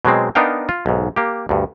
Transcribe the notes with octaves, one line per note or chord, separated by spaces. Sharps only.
B2 F#3 G#3 C4
B3 D4 D#4 A#4 F5 G5
F4
B1 G#2
A#3 G4
D2 G2